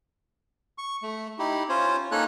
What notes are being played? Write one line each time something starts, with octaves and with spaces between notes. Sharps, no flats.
C#6
A3
D#4 E4 G4
C#4 F4 C5 C#5
A#3 C#4 D#4 A4 C#5 F#6